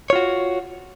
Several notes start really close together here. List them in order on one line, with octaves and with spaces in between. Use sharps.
C#5 F4 F#4